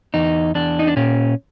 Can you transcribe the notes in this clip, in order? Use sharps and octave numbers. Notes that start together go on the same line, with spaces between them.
E2 D#4
E2 D4
D#4
D4
A#2 C#4